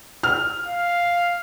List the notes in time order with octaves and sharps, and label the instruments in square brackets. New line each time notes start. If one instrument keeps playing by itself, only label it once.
[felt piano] F6
[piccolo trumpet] F5